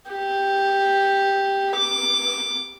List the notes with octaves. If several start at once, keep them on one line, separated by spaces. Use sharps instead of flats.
G4
D6